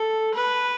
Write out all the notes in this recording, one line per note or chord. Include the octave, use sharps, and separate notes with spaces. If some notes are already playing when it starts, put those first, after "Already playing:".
Already playing: A4
B4